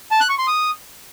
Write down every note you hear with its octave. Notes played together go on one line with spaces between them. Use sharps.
A5
F#6
C#6
C6
D#6